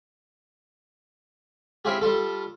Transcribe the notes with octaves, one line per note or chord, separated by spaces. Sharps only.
C4 E4 F4 G4 G#4
G3 F4 A4